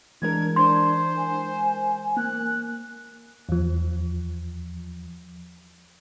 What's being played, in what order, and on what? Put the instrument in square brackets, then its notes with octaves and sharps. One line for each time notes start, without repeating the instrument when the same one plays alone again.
[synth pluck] E3 G#3 A#4 [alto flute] D4 [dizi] G#6
[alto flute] D4 [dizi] C5 [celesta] C6
[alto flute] G#5
[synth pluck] A#3 [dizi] F#6
[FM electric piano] E2 F3